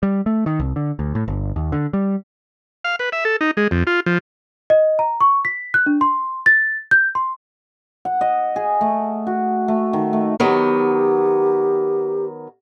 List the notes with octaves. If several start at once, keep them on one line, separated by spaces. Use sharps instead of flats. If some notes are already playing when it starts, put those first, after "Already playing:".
G3
A3
D#3
C2
D3
D2
A2
G1
D#2
D3
G3
F5
B4
E5
A4
D#4
G#3
F2
F4
F3
D#5
A#5
C#6
B6
F#6
D4
C6
A6
G6
C6
F#5
D#5
G#4
A3
F#4
A3
D#3
A3
D#3 F#3 B3 G4